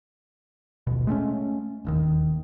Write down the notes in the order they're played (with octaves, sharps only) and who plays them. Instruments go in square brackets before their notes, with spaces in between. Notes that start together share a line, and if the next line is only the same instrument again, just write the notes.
[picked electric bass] D#1 A1 B2
G#3 A3 C4 C#4
E1 D#2 D#3